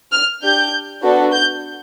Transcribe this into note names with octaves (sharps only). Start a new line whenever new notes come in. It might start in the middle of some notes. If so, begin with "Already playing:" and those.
F6
D4 G4 G6
B3 D4 F#4 A4
G6